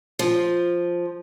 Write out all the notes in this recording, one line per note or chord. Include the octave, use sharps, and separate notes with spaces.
F3